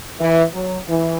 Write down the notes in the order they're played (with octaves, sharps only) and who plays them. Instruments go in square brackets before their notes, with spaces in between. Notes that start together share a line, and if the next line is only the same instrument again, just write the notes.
[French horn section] E3
F#3
E3